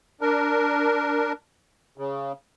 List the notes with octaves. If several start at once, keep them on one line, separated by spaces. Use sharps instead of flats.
D4 A#4
C#3